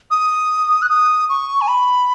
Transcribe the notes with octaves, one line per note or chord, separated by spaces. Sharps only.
D#6
F#6
D#6
C#6
G#5
B5